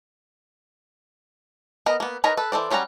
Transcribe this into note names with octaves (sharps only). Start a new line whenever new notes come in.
B3 A#4 D#5
A#3 B3
D#4 A#4 B4 C#5 A#5
A4 B4
E3 A4 C5 D5
F#3 G3 C#4 F#5 A#5